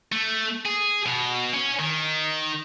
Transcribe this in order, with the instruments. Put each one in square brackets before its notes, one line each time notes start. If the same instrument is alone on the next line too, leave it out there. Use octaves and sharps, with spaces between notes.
[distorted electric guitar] A3
G#4
B2
C#4
D#3